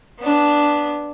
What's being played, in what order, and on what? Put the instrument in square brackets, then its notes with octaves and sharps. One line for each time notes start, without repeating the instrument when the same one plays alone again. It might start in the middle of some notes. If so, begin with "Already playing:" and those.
[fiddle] B3 D4